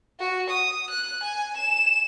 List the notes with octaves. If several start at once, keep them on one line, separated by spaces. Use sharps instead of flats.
F#4
D#6
F#6
G#5
E7